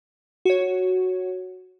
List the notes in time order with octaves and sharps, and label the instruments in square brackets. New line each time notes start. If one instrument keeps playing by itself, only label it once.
[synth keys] F#4 C#5